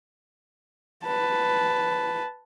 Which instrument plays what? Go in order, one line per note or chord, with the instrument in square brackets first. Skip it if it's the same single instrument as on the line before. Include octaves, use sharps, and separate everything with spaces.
[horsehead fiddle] B4 A5